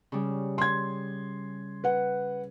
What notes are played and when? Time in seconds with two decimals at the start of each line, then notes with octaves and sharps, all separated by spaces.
0.12 C#3 G3
0.58 C6 G#6
1.84 B4 F#5